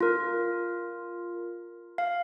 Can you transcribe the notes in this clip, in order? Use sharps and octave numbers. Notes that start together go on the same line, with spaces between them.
F4 A#4
F5